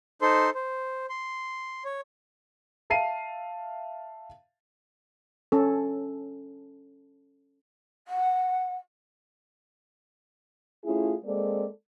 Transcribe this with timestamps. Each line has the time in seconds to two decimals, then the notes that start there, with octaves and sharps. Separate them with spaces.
0.22 D#4 A4 C5 C6
0.55 C5
1.09 C6
1.85 C#5
2.90 E5 F5 A5 C7 D#7
5.52 C#4 A4
8.07 F#5
10.84 A3 C#4 E4 F4 G#4
11.24 G#3 A#3 C4 A4 D5